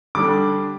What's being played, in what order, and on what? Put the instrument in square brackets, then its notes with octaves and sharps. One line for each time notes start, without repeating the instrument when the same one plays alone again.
[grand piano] D3 G3 D4 D6